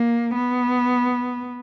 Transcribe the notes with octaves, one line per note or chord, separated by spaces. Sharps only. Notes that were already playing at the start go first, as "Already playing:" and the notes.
Already playing: A#3
B3